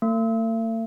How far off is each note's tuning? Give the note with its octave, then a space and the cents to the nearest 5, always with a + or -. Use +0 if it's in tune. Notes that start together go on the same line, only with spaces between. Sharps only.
A3 +45